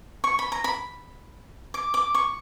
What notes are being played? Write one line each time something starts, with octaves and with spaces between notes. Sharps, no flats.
C#6
B5
A#5
B5
D6
D6
C#6